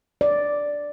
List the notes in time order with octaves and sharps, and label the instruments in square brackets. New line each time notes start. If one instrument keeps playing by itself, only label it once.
[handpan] D5